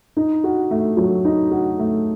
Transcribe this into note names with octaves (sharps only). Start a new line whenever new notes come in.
D#4
F#4
A3
F#3
D#4
F#4
A3